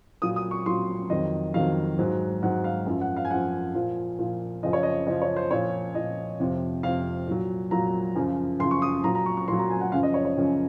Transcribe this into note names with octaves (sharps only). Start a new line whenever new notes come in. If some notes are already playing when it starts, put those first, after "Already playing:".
A#2 F#3 D#6
D#6
C#6
A#2 F#3 C6
F2 D#3 F#3 D#5
F2 D#3 F#3 F5
G#2 F#3
G#2 F#3 F#5
F5
F#2 F3
F#5
F5
G#5
F#2 F3 F#5
A#2 F3
A#2 F3
F#2 C#3 F3 D#5
C#5
D#5
F#2 C#3 F3 D#5
C#5
C5
A#2 F3 C#5
A#2 F3 D#5
F2 C3 F3
F2 C3 F3 F5
A#2 F#3
A#2 F#3 A#5
F#2 C#3 F3
F#2 C#3 F3 C6
C#6
D#6
A#2 F#3 A#5
A#5
C#6
C#6
A#2 F#3 C6
A#5
G#5
F#5
F#2 C#3 F3 F5
D#5
C#5
C#5
F#2 C#3 F3